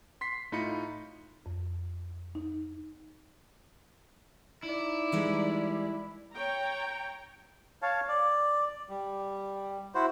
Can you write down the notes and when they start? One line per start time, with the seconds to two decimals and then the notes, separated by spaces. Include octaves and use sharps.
0.21 C6 B6 C7
0.52 A2 D#4 F4 B5 C#7
1.46 F2
2.35 D#4
4.64 D#4 E4 D5
5.12 E3 G3 G#3
6.35 C#5 G5 A#5
7.82 C#5 F5 A5
8.08 D5
8.89 G3
9.95 E4 F#4 C5